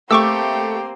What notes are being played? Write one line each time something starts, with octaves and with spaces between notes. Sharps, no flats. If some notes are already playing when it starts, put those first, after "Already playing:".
A3 A#3 C4 G4 C#6 D6 E6